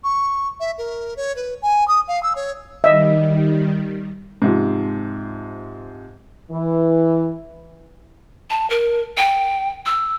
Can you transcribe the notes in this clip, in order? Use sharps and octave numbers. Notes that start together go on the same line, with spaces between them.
C#6
E5
A#4
C#5
B4
G#5
D#6
F5
E6
C#5
D#3 G3 D#5 E5
G#2 C3 F3
E3
A5
A#4
G5
E6